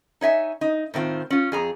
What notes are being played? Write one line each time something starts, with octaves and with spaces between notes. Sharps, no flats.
D#4 C#5 E5 G#5
D#4
A2 D#3 C4 F4
C#4 F4
F2 G#4 A#5